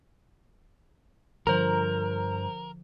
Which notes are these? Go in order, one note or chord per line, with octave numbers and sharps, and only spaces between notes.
G2 D3 F3 A#4 C5 A#5